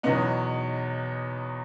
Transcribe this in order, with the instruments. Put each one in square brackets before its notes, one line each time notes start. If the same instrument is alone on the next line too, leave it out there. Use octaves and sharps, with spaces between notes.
[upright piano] E2 B2 F#3 B3 D#4